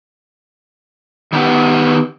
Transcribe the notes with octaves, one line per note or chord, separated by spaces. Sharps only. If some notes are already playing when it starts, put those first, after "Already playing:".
D#3 B3 C#4 G4 B4 F#5